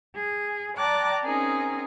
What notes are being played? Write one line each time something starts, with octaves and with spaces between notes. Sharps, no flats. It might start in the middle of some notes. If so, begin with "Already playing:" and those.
G#4
D5 G5 A5 A#5 D6 F#6
C4 C#4 D#4 G#4 A#4